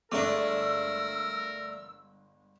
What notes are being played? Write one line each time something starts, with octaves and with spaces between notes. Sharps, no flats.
G1 G#3 A3 D4 A#4 D6 E6